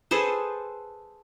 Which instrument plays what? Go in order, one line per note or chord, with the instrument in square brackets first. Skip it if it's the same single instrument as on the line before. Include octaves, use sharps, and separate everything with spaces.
[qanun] G#4 A4 B4 C5